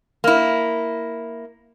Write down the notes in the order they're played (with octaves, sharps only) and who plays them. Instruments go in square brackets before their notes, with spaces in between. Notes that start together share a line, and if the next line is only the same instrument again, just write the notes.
[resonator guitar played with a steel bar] A#3 E4